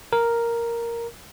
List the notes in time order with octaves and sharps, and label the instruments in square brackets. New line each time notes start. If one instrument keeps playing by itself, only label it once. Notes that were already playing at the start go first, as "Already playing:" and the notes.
[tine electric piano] A#4